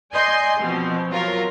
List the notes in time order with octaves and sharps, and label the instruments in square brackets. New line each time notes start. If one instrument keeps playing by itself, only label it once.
[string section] D5 D#5 G#5 C6 G6
B2 F3 C4
F#3 F4 A#4